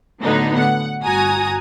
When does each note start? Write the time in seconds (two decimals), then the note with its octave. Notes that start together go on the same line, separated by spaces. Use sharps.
0.20 A2 D3 F#3 B3 D#4
0.58 F#5
1.02 G1 F#4 G#5 A#5 D#6